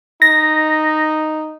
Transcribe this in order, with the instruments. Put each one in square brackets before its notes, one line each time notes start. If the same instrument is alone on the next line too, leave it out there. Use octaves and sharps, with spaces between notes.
[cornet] D#4 [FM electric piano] A#6